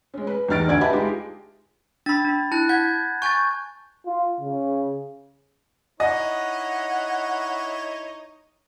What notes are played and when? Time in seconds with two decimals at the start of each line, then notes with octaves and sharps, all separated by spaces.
0.14 G#3 C#4
0.27 B4
0.48 E2 G3 D#4 F6 A6 D7
0.67 D2 D3 D5 G#6 D7
0.81 G4 B4 D#5 E5 A5 B5
0.93 G#3 D#4 F4 G4
2.06 D4 B5 E6 A6
2.25 D4
2.52 E4 A5 F#6
2.69 F#5 G6 G#6
3.22 G#5 C#6 G6 A6
4.06 F4
4.40 C#3
6.00 D#4 E4 C#5 D#5 F#5